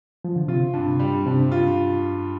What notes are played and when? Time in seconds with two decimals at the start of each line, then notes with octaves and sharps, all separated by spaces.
0.24 F3
0.36 D3
0.48 C3 F4
0.73 G2
0.87 C3
0.99 G3
1.25 G2 C3
1.52 F4